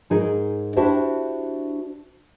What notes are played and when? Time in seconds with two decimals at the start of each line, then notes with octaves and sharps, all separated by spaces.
0.10 G#2 D#4 G#4 A#4
0.76 D4 E4 F#4 G4 C5 E5